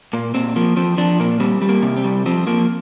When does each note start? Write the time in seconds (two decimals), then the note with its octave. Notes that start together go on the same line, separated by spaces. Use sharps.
0.13 A#2 A#3
0.34 A#2 C4
0.56 F3 A#3
0.77 F3 C4
0.98 F3 D4
1.20 A#2 A#3
1.40 G3 C4
1.62 G3
1.69 A#3
1.83 C3
1.97 C4
2.04 G3
2.26 F3 C4
2.47 F3 A#3